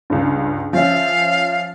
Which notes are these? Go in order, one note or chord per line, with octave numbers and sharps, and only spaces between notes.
C#2 G2
F3 C#4 E5 F5